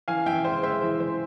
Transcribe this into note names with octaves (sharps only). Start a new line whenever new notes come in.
E3 F5 G#5
E3 E5 G5
G#3 C5
G#3 C5 E5
E3
E3 C5